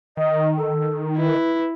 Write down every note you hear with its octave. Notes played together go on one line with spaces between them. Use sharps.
D#3 D#5
A4
E4 B4